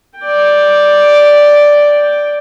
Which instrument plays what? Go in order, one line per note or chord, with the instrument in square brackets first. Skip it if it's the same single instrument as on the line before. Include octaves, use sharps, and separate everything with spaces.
[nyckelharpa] D5 G5